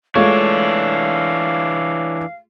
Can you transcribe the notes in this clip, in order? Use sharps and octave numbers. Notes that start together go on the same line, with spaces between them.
E3 G#3 A3 D4 F4 C#5 F5